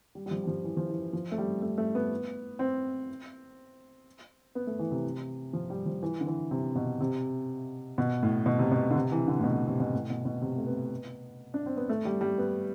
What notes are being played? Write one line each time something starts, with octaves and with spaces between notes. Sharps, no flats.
G3
G3
F3
G3
F3
E3
F3
E3
F3
A3
G3
A3
A3
B3
C4
B3
A3
E3
C3
F3
G3
F3
E3
D3
E3
C3
B2
C3
B2
A2
B2
C3
B2
D3
C3
E3
D3
A2
B2
C3
B2
A2
B2
B2
C3
A3
B3
D4
C4
B3
A3
G3
G3
B3